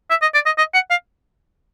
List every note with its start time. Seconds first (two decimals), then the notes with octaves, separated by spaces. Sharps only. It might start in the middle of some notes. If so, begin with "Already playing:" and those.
0.10 E5
0.22 D#5
0.34 D5
0.46 D#5
0.58 D#5
0.74 F#5
0.90 F5